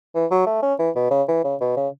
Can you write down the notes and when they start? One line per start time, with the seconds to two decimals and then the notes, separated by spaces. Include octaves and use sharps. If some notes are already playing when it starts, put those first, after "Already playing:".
0.15 E3
0.31 F#3
0.46 A3
0.62 C#4
0.79 E3
0.95 B2
1.11 C#3
1.28 E3
1.44 C#3
1.61 B2
1.77 C#3